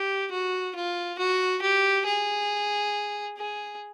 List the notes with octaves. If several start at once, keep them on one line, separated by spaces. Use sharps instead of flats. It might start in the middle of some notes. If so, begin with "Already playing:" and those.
Already playing: G4
F#4
F4
F#4
G4
G#4
G#4